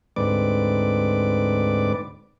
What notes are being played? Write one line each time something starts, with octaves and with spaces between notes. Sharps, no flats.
D2 G#2 C4 B4 D5 D6